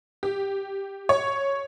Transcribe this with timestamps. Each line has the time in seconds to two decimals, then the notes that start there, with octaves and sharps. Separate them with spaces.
0.23 G4
1.09 C#5